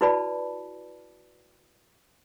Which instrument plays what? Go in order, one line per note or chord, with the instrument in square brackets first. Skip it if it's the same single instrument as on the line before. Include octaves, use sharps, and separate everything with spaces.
[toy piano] E4 F#4 B4 D5 A5 B5